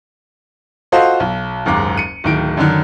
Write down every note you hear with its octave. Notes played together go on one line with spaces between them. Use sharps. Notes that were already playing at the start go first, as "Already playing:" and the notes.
F4 F#4 A4 C5 D#5 F5
B1
F#1 D#2 G#2 D6
C#7 D#7
D1 D#3 D7
F#2 D3 D#3